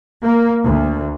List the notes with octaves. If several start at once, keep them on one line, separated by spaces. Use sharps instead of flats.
A#3
D2